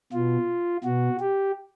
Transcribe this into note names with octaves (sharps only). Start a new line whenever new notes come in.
B2 F4
B2 F#4
G4